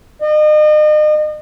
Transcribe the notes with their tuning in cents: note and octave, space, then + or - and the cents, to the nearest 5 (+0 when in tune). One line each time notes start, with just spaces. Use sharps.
D#5 -40